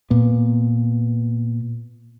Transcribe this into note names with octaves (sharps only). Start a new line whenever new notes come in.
A#2 B3